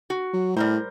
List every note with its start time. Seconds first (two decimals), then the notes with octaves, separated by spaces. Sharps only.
0.10 F#4
0.34 F#3
0.56 A2 G3 A#4 C5